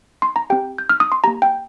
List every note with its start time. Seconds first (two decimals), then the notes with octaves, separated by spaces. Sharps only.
0.22 C6
0.36 A#5
0.50 C4 G4 G5
0.78 G6
0.89 F6
1.00 D#6
1.12 C6
1.24 A#3 G4 A#5
1.42 G5